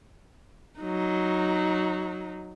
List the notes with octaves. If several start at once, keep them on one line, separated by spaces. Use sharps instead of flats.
F#3 D#4